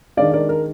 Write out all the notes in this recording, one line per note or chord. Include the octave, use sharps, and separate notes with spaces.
D#3 G#3 D4 D5 F5
A#4 D5
A#4